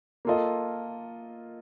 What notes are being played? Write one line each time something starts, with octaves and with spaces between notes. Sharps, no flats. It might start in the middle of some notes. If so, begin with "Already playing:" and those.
A#3 F4 A4 D#5